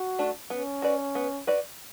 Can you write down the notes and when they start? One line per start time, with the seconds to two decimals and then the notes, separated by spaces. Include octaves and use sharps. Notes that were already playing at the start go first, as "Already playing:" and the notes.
Already playing: F#4
0.19 A3 D4
0.50 B3 C#4
0.82 F#4 B4 D5
1.15 B3
1.47 F#4 B4 D5